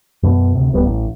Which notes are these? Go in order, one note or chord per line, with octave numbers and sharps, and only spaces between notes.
F#2 B2
D2 C3
D1 G3 B3
A1